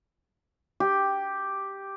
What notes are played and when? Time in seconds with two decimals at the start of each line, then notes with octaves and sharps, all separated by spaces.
0.80 G4